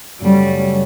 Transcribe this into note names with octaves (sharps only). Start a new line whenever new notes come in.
F#2 C#3 F#3 G3 A3 C#4